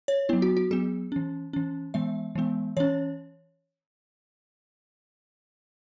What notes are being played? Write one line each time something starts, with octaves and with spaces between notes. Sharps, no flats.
C#5
F#3 B3 E4
F#4
F#4
F#3 B3 G#4
E3 C#4
E3 C#4
E3 G#3 B3 E5
E3 G#3 B3
E3 C#4 C#5